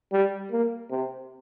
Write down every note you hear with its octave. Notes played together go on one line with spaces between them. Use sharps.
G3
A#3
C3